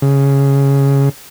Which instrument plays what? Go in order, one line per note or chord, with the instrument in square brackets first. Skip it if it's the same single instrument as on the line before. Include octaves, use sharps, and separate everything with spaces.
[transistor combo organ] C#3